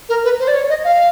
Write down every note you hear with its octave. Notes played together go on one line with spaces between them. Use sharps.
A#4
B4
C5
D5
C#5
D#5
F5